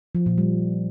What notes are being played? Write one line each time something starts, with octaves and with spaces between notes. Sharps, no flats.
F3
A#2
G3